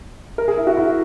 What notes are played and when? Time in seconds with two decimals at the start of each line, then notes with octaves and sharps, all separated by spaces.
0.38 A#4
0.48 G#4
0.57 E4
0.67 F#4
0.77 E4